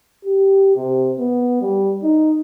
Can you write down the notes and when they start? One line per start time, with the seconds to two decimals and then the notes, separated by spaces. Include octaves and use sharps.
0.25 G4
0.76 C3
1.19 B3
1.61 G3
2.03 D#4